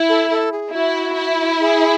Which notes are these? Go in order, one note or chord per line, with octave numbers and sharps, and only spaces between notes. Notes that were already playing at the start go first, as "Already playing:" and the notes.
Already playing: E4
A4
A4
G#4
E4 F#4
E4
G#4